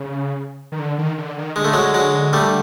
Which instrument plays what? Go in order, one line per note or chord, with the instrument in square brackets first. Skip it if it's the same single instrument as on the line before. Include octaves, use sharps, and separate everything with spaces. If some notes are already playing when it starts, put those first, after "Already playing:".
Already playing: [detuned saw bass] C#3
D#3
D3
D#3
D3
D#3
[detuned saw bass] D3 [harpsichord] G#3
[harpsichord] A3
F#3 G#3
F#3 G#3
G3 A3